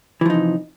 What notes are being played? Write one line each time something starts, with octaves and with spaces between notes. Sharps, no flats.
C3 E3 F3 D#4